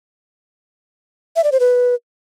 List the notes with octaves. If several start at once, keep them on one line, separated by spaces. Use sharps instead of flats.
E5
D5
C5
B4